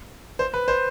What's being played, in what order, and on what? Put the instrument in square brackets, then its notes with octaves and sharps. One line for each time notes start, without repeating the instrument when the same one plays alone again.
[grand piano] C5
B4
C5